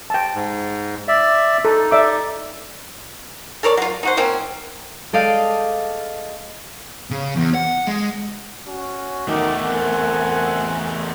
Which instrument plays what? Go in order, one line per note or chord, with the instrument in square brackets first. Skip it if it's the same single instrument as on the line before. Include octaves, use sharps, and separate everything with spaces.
[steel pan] G5 A5
[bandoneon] G#2
D5 E5
[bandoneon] D#4 [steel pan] A4
[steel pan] D5 E5 D6
[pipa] A4 A#4 C#5 D5
F#3 F4
D#4 F#4 C5
F3 A#3 C4 C#4
[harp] G#3 A4 D5 D#5 F5 G5
[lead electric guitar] C#3
E2
F#5
G#3
[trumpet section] C#4 F#4
[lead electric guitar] E2 A3 [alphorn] D#3 [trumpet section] D#4 F#5 D6
[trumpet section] C4 F#5 G#5 [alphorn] A#4